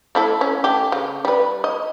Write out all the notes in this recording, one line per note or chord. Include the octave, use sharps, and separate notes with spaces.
A3 E4 A4
C#4
A3 G4
C#3
G3 B4
D#5